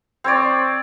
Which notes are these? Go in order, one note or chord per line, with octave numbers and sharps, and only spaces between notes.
C4 C#5 D5